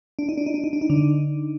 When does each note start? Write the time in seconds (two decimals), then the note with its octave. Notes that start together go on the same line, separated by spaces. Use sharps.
0.19 D4
0.29 D#4
0.38 D4
0.46 D#4
0.54 D4
0.64 D#4
0.73 D4
0.81 D#4
0.90 D3 D4